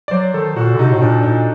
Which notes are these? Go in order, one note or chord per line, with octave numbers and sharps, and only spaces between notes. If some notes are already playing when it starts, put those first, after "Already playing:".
D5
F#3 C5
D#3 A4
A#2 F#4
D3
C3 D#4
A2
A#2 D4
A#2 D#4